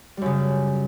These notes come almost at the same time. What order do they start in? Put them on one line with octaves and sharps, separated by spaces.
G3 F#2 C#3